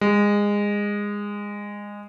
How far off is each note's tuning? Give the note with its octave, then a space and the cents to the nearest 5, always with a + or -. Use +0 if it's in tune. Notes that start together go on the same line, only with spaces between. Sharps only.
G#3 -20